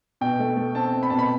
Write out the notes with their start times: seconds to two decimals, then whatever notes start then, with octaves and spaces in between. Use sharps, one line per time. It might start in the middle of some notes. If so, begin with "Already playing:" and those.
0.21 B2 G5
0.39 A3
0.57 A3
0.75 C4 A5
0.93 C4
1.03 B5
1.10 B2 A5
1.19 B5